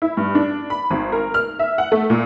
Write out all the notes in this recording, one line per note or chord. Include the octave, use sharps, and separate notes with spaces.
E4
G2
D4
B5
G#1
A#4
F6
E5
F#5
A3
A#2